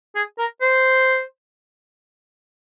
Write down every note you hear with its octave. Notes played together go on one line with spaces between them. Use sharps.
G#4
A#4
C5